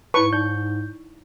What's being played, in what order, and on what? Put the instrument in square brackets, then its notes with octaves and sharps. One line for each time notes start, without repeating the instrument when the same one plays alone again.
[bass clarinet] G#2 [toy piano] E4 C#5 A5 [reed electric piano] B4 [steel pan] C#6
[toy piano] D#4 D5 [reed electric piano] G6